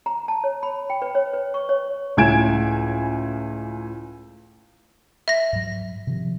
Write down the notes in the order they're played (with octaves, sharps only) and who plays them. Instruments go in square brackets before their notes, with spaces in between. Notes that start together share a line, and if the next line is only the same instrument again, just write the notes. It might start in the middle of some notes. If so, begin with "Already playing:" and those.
[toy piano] A#5
A5
C#5
B5
G5
B4
C#5
B4
C#6
C#5
[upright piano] C#2 A2 G#5 G#6 D7 E7
[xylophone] E5 A#6
[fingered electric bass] G#2 F#3
C3 D#3 F3